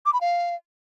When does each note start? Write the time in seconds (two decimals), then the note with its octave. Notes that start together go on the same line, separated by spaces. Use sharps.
0.06 D6
0.13 B5
0.21 F5